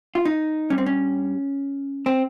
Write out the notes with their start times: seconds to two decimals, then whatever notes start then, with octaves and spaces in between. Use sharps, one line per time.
0.15 F4
0.25 D#4
0.70 G2 G3 C#4
0.78 C4
0.86 C#4
2.06 C4